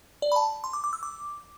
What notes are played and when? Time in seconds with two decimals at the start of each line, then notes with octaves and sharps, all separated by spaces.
0.22 D5
0.32 B5
0.36 A5
0.64 C6
0.73 D6
0.84 D6
0.93 E6
1.03 D6